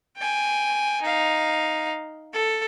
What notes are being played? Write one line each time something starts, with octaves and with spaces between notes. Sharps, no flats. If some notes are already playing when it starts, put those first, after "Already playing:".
G5 G#5
D#4 F5
A4